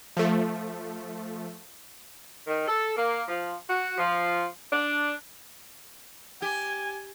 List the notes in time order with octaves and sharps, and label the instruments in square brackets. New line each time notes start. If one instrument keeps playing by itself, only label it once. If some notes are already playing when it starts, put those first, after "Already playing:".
[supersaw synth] F3 A3
[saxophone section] D#3
A4
A#3
F3
F#4
F3
D4
[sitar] G4 [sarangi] G#5